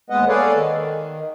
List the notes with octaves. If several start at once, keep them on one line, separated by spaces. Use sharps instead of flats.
D#2 G#3 B3 B4 D#5 F#5
G#4 A4 B4 C#5 D5 F5
D#3